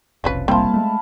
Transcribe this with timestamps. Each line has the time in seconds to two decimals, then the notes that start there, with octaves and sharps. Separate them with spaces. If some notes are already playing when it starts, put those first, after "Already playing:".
0.24 F1 B1 C3 F3 C#4 B4
0.48 G3 A#3 C4 E4 C5 F5 A5
0.74 G#3 A3